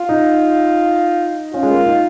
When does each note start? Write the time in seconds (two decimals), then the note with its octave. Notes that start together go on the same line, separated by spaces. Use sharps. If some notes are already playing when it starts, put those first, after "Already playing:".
Already playing: F4
0.09 D#4
1.54 C#4 F4
1.63 G#3
1.70 A#3
1.86 D#4